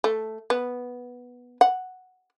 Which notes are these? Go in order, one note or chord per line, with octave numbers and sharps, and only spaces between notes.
A3
B3
F#5